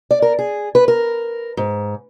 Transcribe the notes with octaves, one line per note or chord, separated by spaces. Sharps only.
D5
A#4
G#4
B4
A#4
G#2